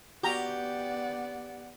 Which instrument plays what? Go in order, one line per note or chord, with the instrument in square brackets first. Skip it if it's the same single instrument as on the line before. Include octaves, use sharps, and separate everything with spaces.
[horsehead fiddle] B3 D5 [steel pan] F#4 A#5 [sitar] G4 [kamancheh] F#5